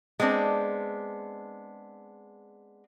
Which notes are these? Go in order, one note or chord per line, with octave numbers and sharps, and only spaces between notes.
G#3 B3 C4 D4